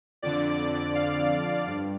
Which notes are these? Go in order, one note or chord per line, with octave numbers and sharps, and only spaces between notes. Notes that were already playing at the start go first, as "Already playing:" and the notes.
F2 D3 D5
F5
G2